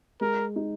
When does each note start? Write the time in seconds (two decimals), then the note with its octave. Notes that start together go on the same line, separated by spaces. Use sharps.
0.21 G#3 A#4
0.56 D#4